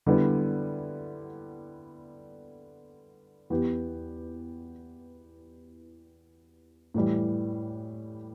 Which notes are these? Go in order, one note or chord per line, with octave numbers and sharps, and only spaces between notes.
D3 G3 B3 E4
E2 E3 B3 G4
A2 E3 G3